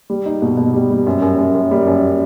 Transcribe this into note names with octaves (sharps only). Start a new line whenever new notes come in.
G3
D#4
B2
B2
G3
G3
F#2
F#2
F#2
F#2
G3
F#2